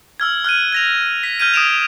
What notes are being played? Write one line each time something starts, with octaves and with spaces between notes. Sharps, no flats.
E6 F6 G#6
F6 F#6 G#6 D#7
G#6 A#6 F7
B6
F6 G6 G#6 D#7
D#6 G#6 D7 E7 F7